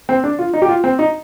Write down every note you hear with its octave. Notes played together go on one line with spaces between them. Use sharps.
C4
D4
F4
D#4
G4
F4
C4
D#4